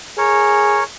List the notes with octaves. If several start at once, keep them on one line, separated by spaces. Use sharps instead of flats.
G#4 A#4 C#5